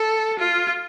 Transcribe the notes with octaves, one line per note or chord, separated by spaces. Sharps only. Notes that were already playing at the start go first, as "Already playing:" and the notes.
Already playing: A4
F4